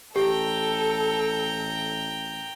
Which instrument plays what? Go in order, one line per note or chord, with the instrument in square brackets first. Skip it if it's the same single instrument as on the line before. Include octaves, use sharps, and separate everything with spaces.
[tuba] A1 [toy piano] G4 [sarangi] A4 [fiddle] G5 A#5